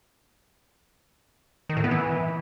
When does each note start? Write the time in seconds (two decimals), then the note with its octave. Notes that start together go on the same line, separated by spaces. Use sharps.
1.69 D#3
1.77 A2
1.84 B3
1.91 E3